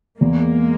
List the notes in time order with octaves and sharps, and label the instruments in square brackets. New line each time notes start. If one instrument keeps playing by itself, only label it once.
[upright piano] E2 [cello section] G#3 A#3